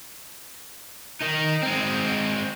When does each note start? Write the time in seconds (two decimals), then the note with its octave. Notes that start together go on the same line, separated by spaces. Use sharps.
1.21 D#3 D#4
1.62 G#3 C4